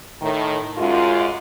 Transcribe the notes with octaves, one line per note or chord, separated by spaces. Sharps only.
A2 D#3
F#2 G#3 F4